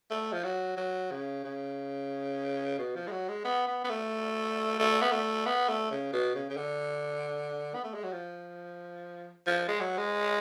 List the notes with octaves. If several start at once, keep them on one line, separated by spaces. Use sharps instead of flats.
A3
F3
F#3
F#3
C#3
C#3
B2
F3
G#3
F#3
G#3
B3
B3
B3
A3
A3
B3
A3
B3
A3
C#3
B2
C#3
C#3
D3
B3
A3
G#3
F#3
F3
F3
G#3
F#3
G#3